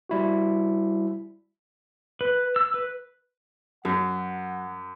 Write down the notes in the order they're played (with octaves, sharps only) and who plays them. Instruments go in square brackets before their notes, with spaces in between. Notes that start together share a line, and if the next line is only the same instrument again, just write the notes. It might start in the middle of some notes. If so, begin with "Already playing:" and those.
[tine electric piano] G3 E4 F#4
[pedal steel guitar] B4
E6
B4
[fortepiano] F#2 [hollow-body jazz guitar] F#3 [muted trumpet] F#5